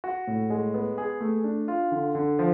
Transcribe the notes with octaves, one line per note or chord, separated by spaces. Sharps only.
F#4
A2
G#3
B3
G#4
A3
D4
F4
D3
D3
F3